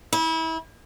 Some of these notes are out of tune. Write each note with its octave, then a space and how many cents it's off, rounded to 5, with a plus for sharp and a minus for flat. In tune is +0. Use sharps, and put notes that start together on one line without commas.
E4 -30